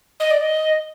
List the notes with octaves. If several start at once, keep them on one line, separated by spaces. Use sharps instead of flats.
D#5
D5
D#5